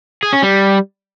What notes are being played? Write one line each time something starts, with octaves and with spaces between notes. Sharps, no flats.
G#4
C#4
G3